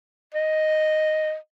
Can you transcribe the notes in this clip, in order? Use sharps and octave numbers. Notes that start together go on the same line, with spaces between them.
D#5